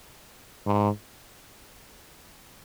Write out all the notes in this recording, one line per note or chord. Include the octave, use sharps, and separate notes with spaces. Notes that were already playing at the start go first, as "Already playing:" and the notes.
G#2